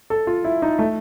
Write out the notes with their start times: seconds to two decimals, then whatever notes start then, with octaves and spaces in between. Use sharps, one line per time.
0.10 A4
0.27 F4
0.44 E4
0.62 D#4
0.79 A3